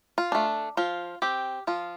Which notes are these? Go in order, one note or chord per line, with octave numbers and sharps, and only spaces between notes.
F4
A3 D4
F3 F4
C4 G4
F3 F4